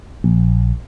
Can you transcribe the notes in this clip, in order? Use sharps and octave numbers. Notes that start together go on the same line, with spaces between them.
A#1